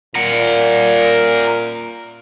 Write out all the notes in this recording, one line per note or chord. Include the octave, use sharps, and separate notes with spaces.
A#2 A#4 F#5